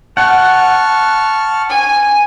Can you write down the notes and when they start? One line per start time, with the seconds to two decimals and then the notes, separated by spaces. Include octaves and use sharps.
0.17 F#5 A5 C#6 F6
1.69 G#5